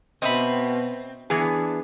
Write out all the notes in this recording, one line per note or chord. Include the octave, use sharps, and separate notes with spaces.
B2 C4 D#5 E5 B5
E3 B3 D4 G#4